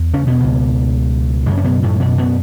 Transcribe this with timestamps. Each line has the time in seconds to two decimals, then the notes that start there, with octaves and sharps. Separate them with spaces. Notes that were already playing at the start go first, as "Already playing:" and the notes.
Already playing: E2
0.13 C#3 C#4
0.27 B2 B3
0.40 C#2 C#3
1.46 F#2 C#3 F#3
1.57 C#4
1.64 B2 B3
1.83 A2 A3
2.00 B2 B3
2.18 B2 B3